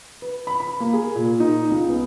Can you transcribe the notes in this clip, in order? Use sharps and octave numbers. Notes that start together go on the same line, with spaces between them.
B4
B5
B5
A#3
G#4
A#2
D#4
C#2
B3